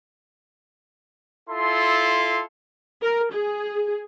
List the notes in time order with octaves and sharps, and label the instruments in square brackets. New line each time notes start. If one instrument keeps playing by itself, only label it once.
[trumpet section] E4 F4 A4 C6
[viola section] A#4
G#4